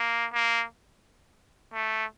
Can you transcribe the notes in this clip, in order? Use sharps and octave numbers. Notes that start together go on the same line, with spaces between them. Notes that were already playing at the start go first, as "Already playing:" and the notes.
Already playing: A#3
A#3
A3